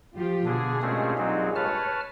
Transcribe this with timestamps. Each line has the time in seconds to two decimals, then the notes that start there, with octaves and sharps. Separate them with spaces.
0.15 F3 F4 G4
0.46 B2 D3 D4 G#4
0.82 G2 A#2 G#3 A3 C4 C#4
1.18 F#3 C4 D#4
1.56 B4 C#5 A5 F6